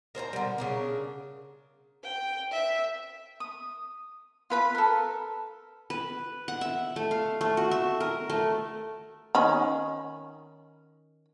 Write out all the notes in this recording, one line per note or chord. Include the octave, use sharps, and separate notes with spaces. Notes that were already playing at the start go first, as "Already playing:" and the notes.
A#4 C5 A5 A#5
D3 G3
C#3 D4 A#4
G5
E5
D#6
F4 B4 B5
A4 A#4
B4
F#5
E5
A3
F5
A3
F#4
E5
A#4
A3
D#3 C#4 B5